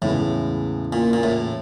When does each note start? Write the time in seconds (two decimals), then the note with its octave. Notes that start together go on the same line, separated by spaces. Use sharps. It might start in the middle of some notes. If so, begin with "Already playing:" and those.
0.02 E2 A2 C#3 E3 G#3 B3
0.93 A#2
1.13 A#2
1.23 A2